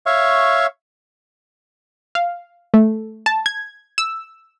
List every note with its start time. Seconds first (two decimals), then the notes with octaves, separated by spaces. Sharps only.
0.06 C#5 E5 F5 C#6
2.15 F5
2.74 A3
3.26 A5
3.46 G#6
3.98 E6